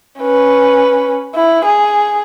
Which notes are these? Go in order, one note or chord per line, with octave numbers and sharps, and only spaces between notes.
C#4 B4
E4
G#4